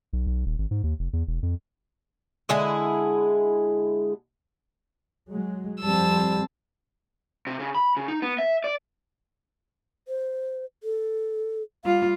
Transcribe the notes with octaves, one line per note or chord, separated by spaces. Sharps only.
B1
B1
D#1
G#1
G#2
D#2
F1
E2
E1
F2
D3 G#3 E4 G#4
F#3 G#3
F2 F3 G3 C4 A5 E6
C3
C#3
B5
C#3
D#4
B3
E5
D5
C5
A4
G3 F4 F5